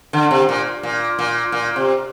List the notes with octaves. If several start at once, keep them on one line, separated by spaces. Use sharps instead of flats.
D3
C3
A#2
A#2
A#2
A#2
C3